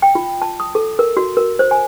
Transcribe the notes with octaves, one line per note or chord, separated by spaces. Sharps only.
G5
F4
A5
D#6
A4
A#4
F#4
A#4
C5
G#5